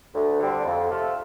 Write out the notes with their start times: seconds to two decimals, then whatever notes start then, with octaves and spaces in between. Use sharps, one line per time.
0.14 D2
0.39 D3 G3 C4
0.64 F2
0.89 C3 A3 F4 A4